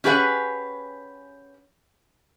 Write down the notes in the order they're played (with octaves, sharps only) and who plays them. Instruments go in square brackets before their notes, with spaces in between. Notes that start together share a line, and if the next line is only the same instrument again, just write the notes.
[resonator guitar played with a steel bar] C#4 G4 G#4 B4 F#5